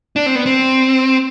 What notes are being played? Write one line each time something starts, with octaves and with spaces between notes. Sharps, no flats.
D4
C4
B3
C4